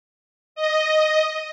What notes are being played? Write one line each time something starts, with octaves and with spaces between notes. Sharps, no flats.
D#5